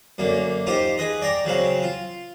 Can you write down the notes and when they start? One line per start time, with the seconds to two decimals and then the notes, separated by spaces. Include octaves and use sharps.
0.18 F#2 D3 A#3
0.67 D#4 F4 G4 C5
0.98 G#4 B4 D#5
1.22 D5 G5 A#5 D6
1.45 C#3 F#3 C4 F5
1.82 F4